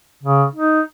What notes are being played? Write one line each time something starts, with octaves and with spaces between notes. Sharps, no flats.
C#3
D#4